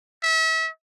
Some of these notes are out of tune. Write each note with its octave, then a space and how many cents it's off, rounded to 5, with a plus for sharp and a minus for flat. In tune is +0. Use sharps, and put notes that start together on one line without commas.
E5 -35